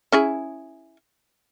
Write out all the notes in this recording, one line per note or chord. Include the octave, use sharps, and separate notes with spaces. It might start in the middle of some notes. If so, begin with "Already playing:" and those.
C#4 E4 G#4